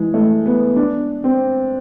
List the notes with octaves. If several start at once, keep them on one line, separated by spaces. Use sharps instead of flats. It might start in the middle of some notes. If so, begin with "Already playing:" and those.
Already playing: E3 G#3
A3
B3
D4
C4